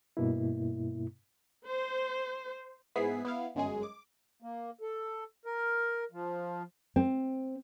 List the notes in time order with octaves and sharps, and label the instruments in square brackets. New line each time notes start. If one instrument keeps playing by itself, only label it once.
[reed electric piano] G2 B2 A#3 E4
[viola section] C5
[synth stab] G#2 B3 E4 G#4 B6 C7
B3 E4 F5
G1 F#2 G#3 G#4
D6
[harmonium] A#3
A4
A#4
F3
[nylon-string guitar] C4